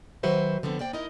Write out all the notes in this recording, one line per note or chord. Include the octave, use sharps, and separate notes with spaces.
D#3 F#3 F#4 B4 C5 E5
D3 F3 B3 C4
A#3 C5 D5 G5
D#4 E4 A#4 D#5